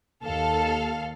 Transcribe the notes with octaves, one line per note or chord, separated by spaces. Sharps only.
D#2 A4 F5